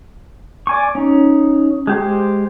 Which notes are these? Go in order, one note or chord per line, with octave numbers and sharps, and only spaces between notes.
D5 G#5 C#6
C#4 D#4
G#3 G4 C5